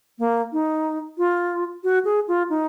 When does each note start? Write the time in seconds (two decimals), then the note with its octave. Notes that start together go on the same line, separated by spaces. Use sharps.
0.19 A#3
0.52 D#4
1.18 F4
1.84 F#4
2.05 G#4
2.28 F4
2.50 D#4